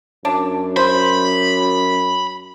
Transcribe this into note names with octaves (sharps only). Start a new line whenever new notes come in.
F#2 D4
C5 B5